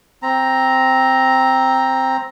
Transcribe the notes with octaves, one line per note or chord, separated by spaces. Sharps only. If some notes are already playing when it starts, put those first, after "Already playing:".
C4 A#5